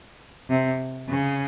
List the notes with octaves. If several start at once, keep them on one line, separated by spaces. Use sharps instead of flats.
C3
C#3